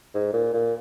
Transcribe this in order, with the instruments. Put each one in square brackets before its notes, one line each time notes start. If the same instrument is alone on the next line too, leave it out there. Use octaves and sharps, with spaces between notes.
[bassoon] G#2
A#2
A#2